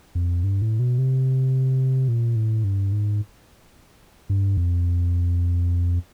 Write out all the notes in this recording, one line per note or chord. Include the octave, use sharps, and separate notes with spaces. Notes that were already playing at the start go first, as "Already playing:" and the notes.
F2
G2
A2
B2
C3
A#2
A2
G2
G#2
G2
F2